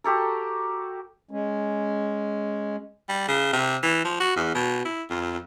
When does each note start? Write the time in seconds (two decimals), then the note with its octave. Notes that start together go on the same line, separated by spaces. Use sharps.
0.04 F#4 G4 A4 A#4
1.31 G#3 C#4
3.09 G3
3.28 C#3
3.53 C3
3.83 E3
4.04 F3
4.20 F#4
4.36 E2
4.55 B2
4.85 E4
5.10 F2